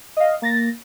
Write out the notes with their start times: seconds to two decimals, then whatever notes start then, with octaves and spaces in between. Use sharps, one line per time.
0.17 D#5 F5
0.42 A#3 A6 A#6